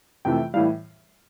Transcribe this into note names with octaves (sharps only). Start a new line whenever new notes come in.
F2 C3 E3 A3 G5
A2 E3 G3 F5